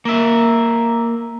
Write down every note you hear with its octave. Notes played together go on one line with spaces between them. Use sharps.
A#3 E5